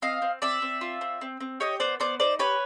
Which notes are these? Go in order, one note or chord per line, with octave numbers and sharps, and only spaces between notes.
C4 D#5 F5
C4
C4 D5 E5
C4
F4
C4
C4
C4
G4 C#5 D#5
B3 C5 D5
B3 C5 D5
D#4 C5 D5
G4 B4 C#5